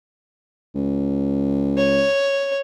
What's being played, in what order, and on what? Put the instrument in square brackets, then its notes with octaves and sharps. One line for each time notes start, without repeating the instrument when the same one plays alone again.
[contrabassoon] C#2
[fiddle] C#5